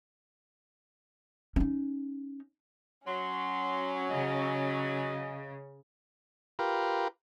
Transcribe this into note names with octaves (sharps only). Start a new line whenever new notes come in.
C#4 D#4
F#3 C#4 C6
C#3 D#5
F4 G4 A#4 B4